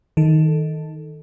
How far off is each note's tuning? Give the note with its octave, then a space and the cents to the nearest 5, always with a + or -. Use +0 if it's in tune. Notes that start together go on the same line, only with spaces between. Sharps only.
D#3 +15 A4 +0